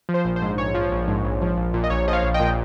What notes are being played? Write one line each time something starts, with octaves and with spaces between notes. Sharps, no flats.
F3
C5
A#1
C5
G#2
A#1 C#5
F3
A#1
G#2
A#1
F3
A#1
A#2
D#5
A#1 C#5
F3 D#5
C#5 F5
A#1
D#5 G5
A#2